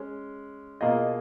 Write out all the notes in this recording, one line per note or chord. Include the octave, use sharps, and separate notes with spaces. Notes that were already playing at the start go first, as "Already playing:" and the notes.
Already playing: G#3 C#4
B2 A#3 F4 G#4 D#5